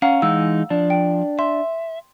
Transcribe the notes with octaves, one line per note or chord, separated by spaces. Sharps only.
C#4 F5 F#5 A#5
G#2 E3 G#3 D#4 E6
F3 D4
G5
E5 C6